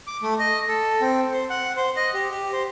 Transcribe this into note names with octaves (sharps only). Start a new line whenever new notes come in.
D6
A3
D#5
A4
C4
C5
F#5
C5
D#5
G4
G4
C5